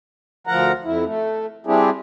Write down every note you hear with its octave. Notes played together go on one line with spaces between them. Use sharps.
D2 F3 A#4 F#5 A#5
F2 E4
A3
G3 C4 D4 E4 G4 G#4